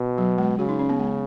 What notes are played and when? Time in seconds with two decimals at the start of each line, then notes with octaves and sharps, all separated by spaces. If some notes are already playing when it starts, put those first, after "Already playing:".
Already playing: B2
0.18 F#3
0.38 G#3
0.59 C#3 F#4
0.69 D#4
0.79 C#4
0.89 B3
0.99 G#3